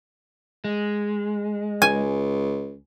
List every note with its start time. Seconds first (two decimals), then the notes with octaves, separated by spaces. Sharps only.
0.64 G#3
1.82 C#2 G#5